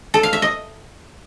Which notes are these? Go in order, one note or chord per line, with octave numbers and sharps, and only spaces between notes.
A4
F5
E5
D#5